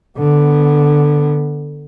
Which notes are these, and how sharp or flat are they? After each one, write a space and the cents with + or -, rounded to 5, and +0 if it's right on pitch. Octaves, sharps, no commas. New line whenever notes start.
D3 +5 B3 +0